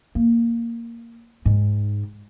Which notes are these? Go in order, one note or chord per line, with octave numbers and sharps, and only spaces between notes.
A#3
G#2